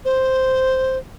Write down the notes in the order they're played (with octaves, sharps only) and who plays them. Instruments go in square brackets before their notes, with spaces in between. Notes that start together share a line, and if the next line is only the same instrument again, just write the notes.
[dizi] C5